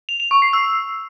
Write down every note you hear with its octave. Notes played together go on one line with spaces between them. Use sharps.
F7
F7
C#6
C7
E6